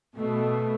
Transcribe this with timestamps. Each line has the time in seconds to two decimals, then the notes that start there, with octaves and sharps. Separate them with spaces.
0.15 B2 A3